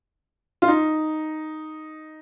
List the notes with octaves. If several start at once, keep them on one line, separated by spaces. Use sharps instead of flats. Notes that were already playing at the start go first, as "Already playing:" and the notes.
F4
D#4